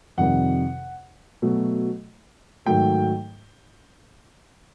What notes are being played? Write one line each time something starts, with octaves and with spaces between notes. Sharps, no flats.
F2 C3 D#3 G3 F#5
B2 F#3 A3
G#2 D#3 F#3 A3 G5